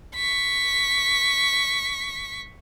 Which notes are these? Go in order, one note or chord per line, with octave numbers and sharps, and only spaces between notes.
C#6 B6